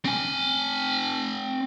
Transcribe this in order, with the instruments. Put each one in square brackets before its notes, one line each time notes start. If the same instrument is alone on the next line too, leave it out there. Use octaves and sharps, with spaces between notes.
[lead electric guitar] C4 G#5